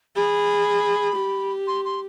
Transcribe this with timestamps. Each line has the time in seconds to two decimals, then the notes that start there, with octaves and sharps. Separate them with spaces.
0.16 G#4 B5
1.17 G4
1.67 C6
1.84 C6